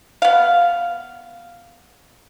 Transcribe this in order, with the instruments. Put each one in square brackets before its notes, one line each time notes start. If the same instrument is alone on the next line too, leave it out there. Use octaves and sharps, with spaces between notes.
[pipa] B3 F5